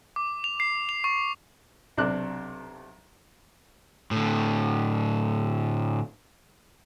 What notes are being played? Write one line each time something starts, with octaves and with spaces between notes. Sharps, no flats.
D6
F7
C7
F7
C#6
B1 C3 D4 D6 F#6
A2 D3